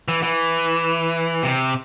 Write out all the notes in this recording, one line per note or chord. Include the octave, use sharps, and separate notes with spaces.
E3
E3
C3